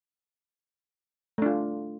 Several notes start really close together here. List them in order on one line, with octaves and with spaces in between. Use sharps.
A3 D4 F4